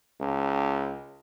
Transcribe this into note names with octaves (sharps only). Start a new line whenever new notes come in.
C#2